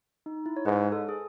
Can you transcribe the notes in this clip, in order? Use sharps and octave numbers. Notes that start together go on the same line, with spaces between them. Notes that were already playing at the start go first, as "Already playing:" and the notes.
D#4
E4
C#5
G#2 B4
A4
G#4